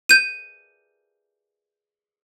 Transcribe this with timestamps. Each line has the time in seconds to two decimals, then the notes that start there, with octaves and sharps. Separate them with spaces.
0.09 G6 D#7